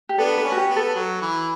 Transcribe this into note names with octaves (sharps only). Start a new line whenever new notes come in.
G4
B3 D4 A4
B4
C#4
F#4
G4
B3
A4
F#3
E3